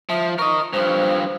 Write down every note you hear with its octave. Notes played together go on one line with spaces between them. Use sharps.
F3 E5
A#4 D#5 C#6
G2 F3 C5